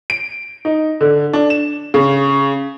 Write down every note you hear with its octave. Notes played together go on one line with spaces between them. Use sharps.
D7
D#4
D3
D4
E7
C#3